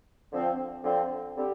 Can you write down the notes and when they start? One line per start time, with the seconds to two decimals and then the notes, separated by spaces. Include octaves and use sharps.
0.32 D3 F3 C4
0.84 D3 F3 C4
1.36 D3 G3 C4 G4